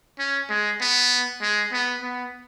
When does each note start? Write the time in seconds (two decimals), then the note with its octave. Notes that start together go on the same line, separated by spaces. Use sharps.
0.19 C#4
0.50 G#3
0.81 B3
1.41 G#3
1.72 B3
2.02 B3